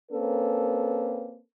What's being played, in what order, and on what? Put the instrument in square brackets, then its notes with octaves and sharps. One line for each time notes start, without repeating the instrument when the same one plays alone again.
[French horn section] A#3 C4 C#4 A4 B4